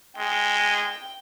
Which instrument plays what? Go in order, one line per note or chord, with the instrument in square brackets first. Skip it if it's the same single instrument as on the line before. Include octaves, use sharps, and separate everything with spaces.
[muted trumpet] G#3 [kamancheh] G5